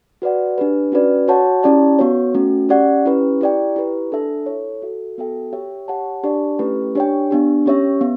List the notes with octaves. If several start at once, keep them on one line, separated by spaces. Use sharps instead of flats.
F#4 B4 D5 F#5
D4 G4 B4
C#4 F#4 B4 D5
F#4 C#5 F#5 A5
C#4 E4 G4 D5 A5
B3 F#4 C#5
A3 C#4 F#4
C#4 G4 D5 F#5
C#4 E4 G4 B4
E4 G4 D5 G5
E4 G4 B4
D4 A4 E5 A5
E4 A4 C#5
F#4 A4 E5
B3 F#4 A4 E5 G5
G4 C#5 E5 G5
G4 C#5 F#5 A5
D4 G4 D5 A5
A3 C#4 E4 G4 B4
D4 G4 C#5 G5
B3 D4 G4
C#4 G4 C#5 E5
B3